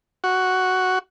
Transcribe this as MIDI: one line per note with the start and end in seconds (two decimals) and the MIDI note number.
0.24 0.99 66